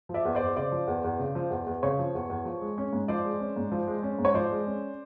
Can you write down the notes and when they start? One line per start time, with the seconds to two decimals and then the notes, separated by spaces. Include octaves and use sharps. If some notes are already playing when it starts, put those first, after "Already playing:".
0.09 F3
0.14 D5 E5
0.25 E2
0.35 C5 D5
0.41 E2
0.56 C#3 C5 D5
0.72 F3
0.87 E2
1.04 E2
1.19 C#3
1.35 F3
1.50 E2
1.66 E2
1.83 C#3 C#5
1.99 F3
2.15 E2
2.30 E2
2.45 F3
2.61 G#3
2.78 C#4
2.93 G#2
3.08 F3 C5 D5
3.25 G#3
3.40 C#4
3.56 G#2
3.72 F3
3.87 G#3
4.03 C#4
4.19 G#2
4.25 C#5
4.34 F3 C5 D5
4.51 G#3
4.67 C#4